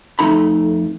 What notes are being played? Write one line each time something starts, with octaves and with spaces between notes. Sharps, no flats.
F2 A3 D#4 A#5 B5